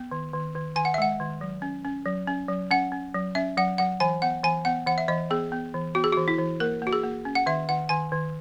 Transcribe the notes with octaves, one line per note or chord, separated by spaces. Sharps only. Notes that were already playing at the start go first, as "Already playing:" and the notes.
Already playing: B3
D#3
D#3
D#3
D#3 G#5
F#5
E5
G#3 F#5
D#3
F#3
C#4
C#4
F#3
C#4
F#3
C#4 F#5
C#4
F#3
C#4 E5
F#3 F#5
F#3 F#5
E3 G#5
B3 F#5
E3 G#5
B3 F#5
E3 F#5
E5
E3 D#5
B3 G#4
B3
E3
B3 F#4
G#4
E3 F#4
E4
E3
A#3 A#4
A#3 F#4
G#4
A#3
C#4
F#5
D#3 E5
D#3 F#5
D#3 G#5
D#3